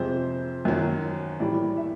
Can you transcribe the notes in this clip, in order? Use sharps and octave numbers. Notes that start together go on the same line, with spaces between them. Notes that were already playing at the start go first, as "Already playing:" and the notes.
Already playing: F2 C3 F3 G#3 C5
F#2 D#3 F#3
A2 E3 G3 D5
E5